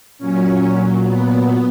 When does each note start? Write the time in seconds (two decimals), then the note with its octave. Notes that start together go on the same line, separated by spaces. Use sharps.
0.18 A#2 F#3 C#4
1.04 B3